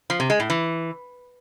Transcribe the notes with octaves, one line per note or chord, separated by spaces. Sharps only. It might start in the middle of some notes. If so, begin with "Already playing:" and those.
F3
C3
G#3
A2
E3